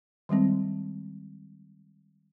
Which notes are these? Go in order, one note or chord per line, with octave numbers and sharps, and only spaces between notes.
D#3 G3 G#3 C4